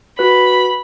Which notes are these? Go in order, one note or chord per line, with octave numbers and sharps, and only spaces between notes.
F#4 B4 B5